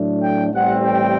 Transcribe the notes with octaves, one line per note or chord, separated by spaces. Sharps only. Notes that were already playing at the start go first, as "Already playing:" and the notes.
Already playing: A2 F#3 A3 D4
G5
A1 A2 E3 G3 C4 F#5
G5